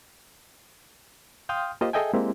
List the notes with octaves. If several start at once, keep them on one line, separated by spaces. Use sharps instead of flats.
F5 G5 C6 D#6 F6 G6
A#3 F4 G4 C5 D#5
G#4 A4 D#5 E5 G5 G#5
G#3 A#3 C4 E4 G4